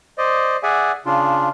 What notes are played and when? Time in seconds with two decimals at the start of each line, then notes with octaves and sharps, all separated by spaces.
0.18 C5 D5 D#5
0.63 G#4 D5 E5 F#5 G#5
1.06 C#3 D4 F4